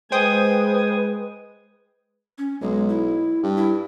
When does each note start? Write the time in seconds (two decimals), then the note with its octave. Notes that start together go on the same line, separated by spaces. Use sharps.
0.12 G#3 B4 C5 G5 G#5 D#6
2.38 C#4
2.61 B1 G#3
2.89 E4
3.43 G2
3.57 E4